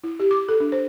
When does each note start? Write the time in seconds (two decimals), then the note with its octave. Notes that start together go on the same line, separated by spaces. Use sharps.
0.04 E4
0.20 G4
0.31 D6
0.49 A4
0.60 D4
0.72 C5